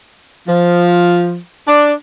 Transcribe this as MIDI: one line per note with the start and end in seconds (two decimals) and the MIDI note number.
0.48 1.37 53
1.68 1.92 62